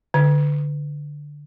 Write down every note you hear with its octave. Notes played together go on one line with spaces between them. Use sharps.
D3